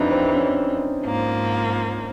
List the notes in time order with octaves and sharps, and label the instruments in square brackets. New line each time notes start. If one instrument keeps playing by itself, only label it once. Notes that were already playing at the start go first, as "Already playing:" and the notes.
Already playing: [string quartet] F2 C3 E3 [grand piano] D4 D#4
[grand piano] C4
C#4
[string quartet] G#2 F3 A#3